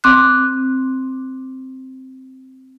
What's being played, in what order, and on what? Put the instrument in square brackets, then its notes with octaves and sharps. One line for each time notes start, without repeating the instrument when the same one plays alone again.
[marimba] C4 D6 F#6